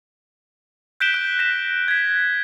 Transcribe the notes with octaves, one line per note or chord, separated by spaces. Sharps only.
F#6 G6 B6 D7 E7 G7
F#6 G6
A#6 B6 E7
G#6 B6